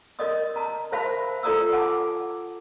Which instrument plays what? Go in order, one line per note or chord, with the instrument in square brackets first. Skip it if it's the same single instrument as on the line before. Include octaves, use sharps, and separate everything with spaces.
[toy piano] A#4 D5 D#5 D#6
A5 A#5
A#4 C5 E5 F5 A5 B5
F4 A4 D5 A#5 D#6 E6
F#5 G#5 A5 D6